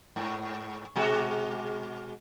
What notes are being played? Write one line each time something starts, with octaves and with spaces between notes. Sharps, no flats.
G#2
B2 G#3 F#4